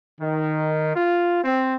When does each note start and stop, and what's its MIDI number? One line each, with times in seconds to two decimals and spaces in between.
0.21 0.92 51
0.96 1.39 65
1.44 1.76 60